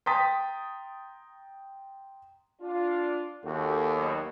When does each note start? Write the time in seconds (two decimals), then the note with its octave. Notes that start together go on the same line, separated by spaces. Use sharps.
0.06 G5 A#5 C6 D#6 A6 B6
2.61 D4 F4
3.45 D#2 F#4 G4 A4
3.96 G2 B2 F#3